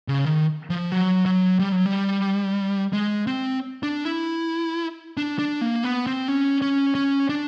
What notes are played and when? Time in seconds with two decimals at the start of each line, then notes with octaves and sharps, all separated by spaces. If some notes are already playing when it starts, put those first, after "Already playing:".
0.08 C#3
0.25 D#3
0.70 F3
0.92 F#3
1.26 F#3
1.59 G3
1.72 F#3
1.86 G3
2.93 G#3
3.27 C4
3.83 D4
4.05 E4
5.17 D4
5.39 D4
5.61 A#3
5.84 B3
6.07 C4
6.28 C#4
6.62 C#4
6.95 C#4
7.29 D4